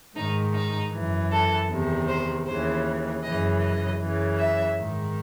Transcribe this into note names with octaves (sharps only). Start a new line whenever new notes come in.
G#2 D#3 D#4
D#4
F#2 E3
A4
E2 C3 D#3
C5
D#2 C#3 E3 C5
F#2 C#3 E3 D#5
D#5
F#2 C#3 E3
E5
G#2 D#3